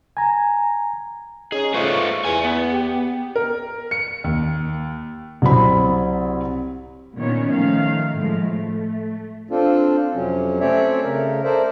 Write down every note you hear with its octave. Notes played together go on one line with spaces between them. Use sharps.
G#5 A#5
C#4 D#4 G#4
G#2 A3 F4 B4 C5 C#6
E2 D5 G#5
B3
G4
A#4
C#7
D#2
C2 F#3 C4 B5
A#2 D#3 B3 C#4 C#5
D#3 F3 A3 F5
A2 F3 G#3
A3
C4 D4 F4 A4
F2 C3 F#3 C#4
A3 C4 C#4 C#5 D5 E5
C#3 A3 A#4
A4 A#4 C5 D5 E5